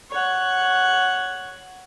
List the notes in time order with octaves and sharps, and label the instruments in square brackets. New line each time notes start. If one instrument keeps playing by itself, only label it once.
[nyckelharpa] C#5 F#5